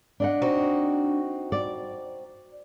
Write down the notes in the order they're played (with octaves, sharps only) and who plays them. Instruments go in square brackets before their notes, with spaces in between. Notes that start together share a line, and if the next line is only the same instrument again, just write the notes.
[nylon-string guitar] D4 D#5 F#5
[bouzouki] C4 D#4 F#4
[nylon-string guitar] D5